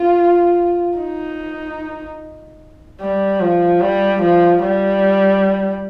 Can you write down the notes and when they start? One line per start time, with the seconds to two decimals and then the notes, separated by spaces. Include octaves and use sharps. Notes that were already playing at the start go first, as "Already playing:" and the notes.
Already playing: F4
0.98 D#4
3.01 G3
3.41 F3
3.81 G3
4.21 F3
4.62 G3